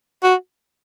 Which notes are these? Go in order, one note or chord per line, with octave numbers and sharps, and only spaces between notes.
F#4